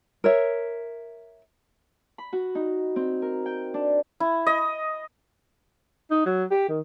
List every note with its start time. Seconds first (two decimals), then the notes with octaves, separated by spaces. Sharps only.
0.24 A#4 C#5 E5
2.18 B5
2.33 F#4
2.55 D#4
2.96 C4
3.22 A#4
3.46 G5
3.74 D4
4.20 E4
4.47 D#5
6.11 D#4
6.26 F#3
6.51 G4
6.69 D#3